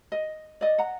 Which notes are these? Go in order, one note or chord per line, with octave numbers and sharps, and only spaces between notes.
D#5
D5 D#5
F#5 A#5